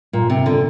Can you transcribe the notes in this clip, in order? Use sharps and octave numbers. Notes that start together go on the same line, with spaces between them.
A#2
C3
D3